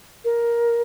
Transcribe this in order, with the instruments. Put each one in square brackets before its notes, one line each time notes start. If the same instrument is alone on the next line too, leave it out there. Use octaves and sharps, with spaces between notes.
[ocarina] A#4